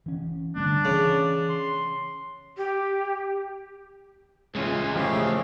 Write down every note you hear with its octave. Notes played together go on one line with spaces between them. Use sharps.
E3 C#4
D3 G3 A3 D4
C#3 E3
C6
G4
C#2 E3 G#3 C#4 F4
C#3 F3 A3 G4 F5